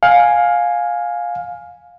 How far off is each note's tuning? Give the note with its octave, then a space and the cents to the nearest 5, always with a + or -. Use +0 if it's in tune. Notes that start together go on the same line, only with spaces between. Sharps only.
F5 +15 G#5 +0